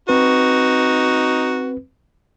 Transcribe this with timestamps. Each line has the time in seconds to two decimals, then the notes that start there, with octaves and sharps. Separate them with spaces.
0.09 C4 D#4 F#4 B4